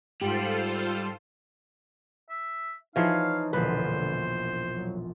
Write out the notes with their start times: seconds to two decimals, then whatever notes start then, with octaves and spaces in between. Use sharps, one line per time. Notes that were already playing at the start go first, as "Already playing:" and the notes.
0.21 G#2 G3 F4 G4 A4 C5
2.30 E5
2.96 E3 F3 D#4 G#4 C#5 F5
3.53 E1 A#1 D3 B4 C5
4.71 F#3